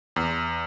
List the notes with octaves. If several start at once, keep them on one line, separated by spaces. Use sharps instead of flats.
E2